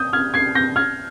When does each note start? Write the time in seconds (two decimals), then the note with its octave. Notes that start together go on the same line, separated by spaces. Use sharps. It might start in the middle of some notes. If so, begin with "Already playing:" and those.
Already playing: D#6 G6
0.13 F6 G#6
0.34 G#6 C7
0.55 G6 A#6
0.76 F6 G#6